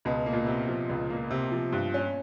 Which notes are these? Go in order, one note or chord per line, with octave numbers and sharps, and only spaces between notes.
C#2 B2
A#3
A#2
C3
F3
C#2
A#3
C3
F3
G2
C#4